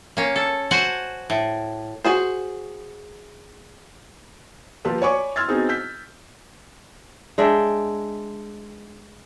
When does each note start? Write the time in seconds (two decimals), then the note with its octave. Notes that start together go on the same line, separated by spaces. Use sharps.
0.17 A#3 C#4
0.36 A4
0.71 F#4 C5 F#5 G#5
1.30 A2
2.05 F#4 G#4 C5
4.85 F3 A#3 F4 G4 A4 B4
5.02 C#5 D5 G#5 B5 C#6 D6
5.36 C6 E6 F6 G#6 A6
5.48 B3 C4 D#4 F#4 G#4
5.69 E6 G6 B6
7.38 G#3 D4 E5 G5